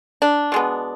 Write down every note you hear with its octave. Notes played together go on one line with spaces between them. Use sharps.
D4
B2 G#3 B3